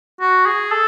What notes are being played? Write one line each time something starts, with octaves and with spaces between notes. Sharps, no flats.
F#4
G#4
A4